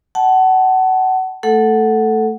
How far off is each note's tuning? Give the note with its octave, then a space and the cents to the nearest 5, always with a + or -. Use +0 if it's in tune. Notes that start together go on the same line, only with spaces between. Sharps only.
F#5 +25 A5 -15
A3 +0 A4 +0 F#5 +0